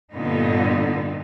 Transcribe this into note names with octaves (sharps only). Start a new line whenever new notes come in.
G2 A#2 D3 B3 D#4